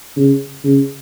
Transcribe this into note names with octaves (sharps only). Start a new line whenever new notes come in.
C#3
C#3